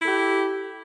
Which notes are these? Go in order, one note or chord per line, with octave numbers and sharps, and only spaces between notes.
E4 G4 A4